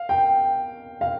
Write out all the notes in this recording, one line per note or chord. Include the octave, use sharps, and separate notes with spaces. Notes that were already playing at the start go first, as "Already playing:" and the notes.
Already playing: F5
G5
F5